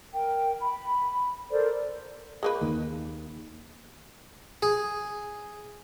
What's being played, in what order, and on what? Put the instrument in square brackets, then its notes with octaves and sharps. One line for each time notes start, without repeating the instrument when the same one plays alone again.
[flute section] A#4 G5
B5
A4 A#4 C5 D5
[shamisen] G#3 A#3 B4
[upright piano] D#2
[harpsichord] G#4